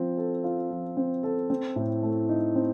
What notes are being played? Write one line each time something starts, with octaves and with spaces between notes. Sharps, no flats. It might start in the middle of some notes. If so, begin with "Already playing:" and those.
Already playing: F3 C4
A4
F4
F3
C4
A4
C4
A2
A3
D#4
C4